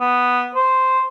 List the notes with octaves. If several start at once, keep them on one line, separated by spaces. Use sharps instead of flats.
B3
C5